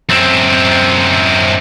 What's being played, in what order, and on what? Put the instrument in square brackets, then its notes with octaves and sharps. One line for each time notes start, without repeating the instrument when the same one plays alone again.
[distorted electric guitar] F#2 C4